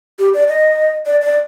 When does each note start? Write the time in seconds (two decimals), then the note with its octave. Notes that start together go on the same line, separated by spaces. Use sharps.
0.19 G4
0.34 D5
0.48 D#5
1.06 D5
1.22 D5